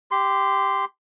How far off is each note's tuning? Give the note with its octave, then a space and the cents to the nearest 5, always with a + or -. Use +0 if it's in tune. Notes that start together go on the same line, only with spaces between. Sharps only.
G4 +0 C6 -20